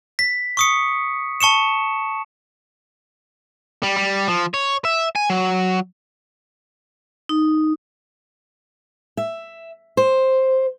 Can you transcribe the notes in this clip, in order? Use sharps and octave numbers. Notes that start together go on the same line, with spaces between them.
B6
C#6 D#6 C#7
A5 C#6 C#7 E7
G3
G3
F3
C#5
E5
G#5
F#3
D#4
E5
C5